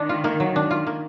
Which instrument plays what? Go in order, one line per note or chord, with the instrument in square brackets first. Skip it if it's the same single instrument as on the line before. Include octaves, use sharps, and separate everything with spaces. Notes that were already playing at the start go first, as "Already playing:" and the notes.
Already playing: [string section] D#3 [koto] D4
[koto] F4
A#3
F#3
D4
F4
A#3